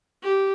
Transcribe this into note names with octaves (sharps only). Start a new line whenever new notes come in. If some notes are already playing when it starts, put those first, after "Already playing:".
G4